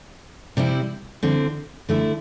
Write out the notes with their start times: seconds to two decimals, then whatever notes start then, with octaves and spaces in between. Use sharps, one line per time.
0.57 C3 G3 C4 E4
1.23 D3 C4 E4
1.89 D3 A3 E4